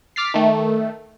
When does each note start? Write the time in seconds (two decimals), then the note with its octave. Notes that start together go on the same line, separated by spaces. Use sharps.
0.16 D6 F6 A6 B6 C7
0.34 D#3 A3